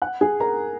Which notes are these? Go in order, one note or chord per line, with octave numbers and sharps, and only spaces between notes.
F#5 F#6
G#4 G#5
A#4 A#5